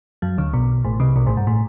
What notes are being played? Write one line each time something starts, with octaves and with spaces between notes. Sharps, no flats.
F#2 F#3
D2 D3
B1 B2
A1 A2
C2 C3
B1 B2
A1 A2
G2
A2